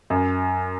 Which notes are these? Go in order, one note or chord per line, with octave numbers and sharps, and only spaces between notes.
F#2